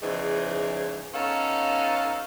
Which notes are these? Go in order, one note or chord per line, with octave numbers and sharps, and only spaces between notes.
E2 G#2 C#3 E3 F3 D#4
B3 C#4 D#4 A4 F5